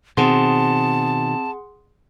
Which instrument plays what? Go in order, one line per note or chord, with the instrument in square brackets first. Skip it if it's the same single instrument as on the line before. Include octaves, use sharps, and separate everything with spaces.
[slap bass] B2 D#3 [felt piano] C4 [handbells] G#4 F#5 C6 [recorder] A5